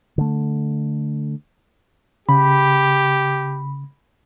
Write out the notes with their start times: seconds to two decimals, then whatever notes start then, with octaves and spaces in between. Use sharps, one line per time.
0.18 D3 A3
2.29 C#3 G4 B5